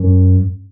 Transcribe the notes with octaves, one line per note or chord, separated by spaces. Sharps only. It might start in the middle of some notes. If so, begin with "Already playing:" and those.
Already playing: F#2